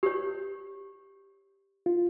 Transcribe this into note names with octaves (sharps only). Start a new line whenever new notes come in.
G4 C#5
F4